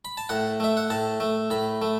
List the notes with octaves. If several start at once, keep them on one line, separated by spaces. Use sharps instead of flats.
B5
A5
A2 F#5
A3 E5
F#5
A2 A5
A3
A2 B5
A3